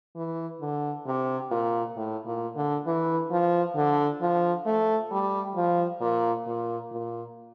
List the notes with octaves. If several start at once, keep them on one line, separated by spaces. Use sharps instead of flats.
E3
D3
C3
A#2
A2
A#2
D3
E3
F3
D3
F3
A3
G3
F3
A#2
A#2
A#2